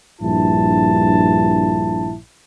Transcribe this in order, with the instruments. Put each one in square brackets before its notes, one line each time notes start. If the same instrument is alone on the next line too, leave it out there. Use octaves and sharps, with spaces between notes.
[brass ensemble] A#1 G2 E4 A5